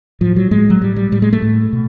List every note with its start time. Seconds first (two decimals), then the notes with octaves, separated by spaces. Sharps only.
0.21 A2 F3
0.36 F#3
0.51 A2 G#3
0.70 F#3
0.82 A2 G3
0.96 G3
1.12 A2 G3
1.22 G#3
1.33 A3
1.42 A2
1.73 B2